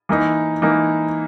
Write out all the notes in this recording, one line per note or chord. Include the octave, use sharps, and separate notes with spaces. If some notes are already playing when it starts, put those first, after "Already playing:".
E3 A#3 D#4
E3 A#3 D#4